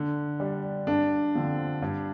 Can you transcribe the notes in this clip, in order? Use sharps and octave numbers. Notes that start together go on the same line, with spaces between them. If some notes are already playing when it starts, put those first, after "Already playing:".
Already playing: D3
G3 D4
G2 D4
D3 F3 C4
G2